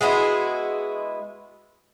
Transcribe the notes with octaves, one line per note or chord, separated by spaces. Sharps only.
G#3 B3 E4 F#4